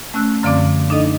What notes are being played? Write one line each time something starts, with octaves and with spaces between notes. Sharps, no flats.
A3 C#4 E6 F#6
F#2 D3 F3 C4 D5 D6
D4 D#4 A4 D#5